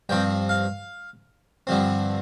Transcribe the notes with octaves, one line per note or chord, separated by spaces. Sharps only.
G2 F3 C4 G5
F5
G2 D3 F3 C4